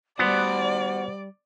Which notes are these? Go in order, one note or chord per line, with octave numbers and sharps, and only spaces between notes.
G3 B3 F#4 C5 D5